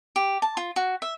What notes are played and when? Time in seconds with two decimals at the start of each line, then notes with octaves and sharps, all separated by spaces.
0.16 G4
0.42 A5
0.57 F4
0.76 F#4
1.02 E5